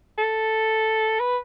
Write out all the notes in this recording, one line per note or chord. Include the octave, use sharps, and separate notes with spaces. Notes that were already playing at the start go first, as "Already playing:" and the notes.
A4
B4